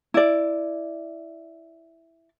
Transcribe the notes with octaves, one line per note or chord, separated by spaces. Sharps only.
E4 D5